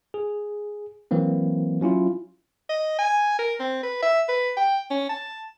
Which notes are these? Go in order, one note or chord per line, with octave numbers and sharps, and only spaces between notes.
G#4
E3 F#3 A#3 C4
F#3 C#4 E4 F4
D#5
G#5
A#4
C4
B4
E5
B4
G5
C#4
A5